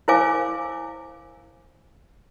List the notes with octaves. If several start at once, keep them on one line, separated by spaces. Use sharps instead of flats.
E4 A#4 C5 F5 G#5 D6